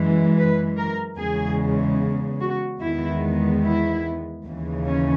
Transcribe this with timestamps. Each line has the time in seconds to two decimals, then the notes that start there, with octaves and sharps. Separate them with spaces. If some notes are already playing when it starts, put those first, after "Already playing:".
Already playing: F#2 E3 G#3
0.38 B4
0.79 A#4
1.18 E2 C#3 G#3 G#4
2.41 F#4
2.82 E2 D#3 G#3 B3 E4
3.63 E4
4.45 D#2 C#3 E3
4.86 C#4